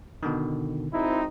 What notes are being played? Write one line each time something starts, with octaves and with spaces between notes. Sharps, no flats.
B2 D3 D#3
G#1 C4 D#4 E4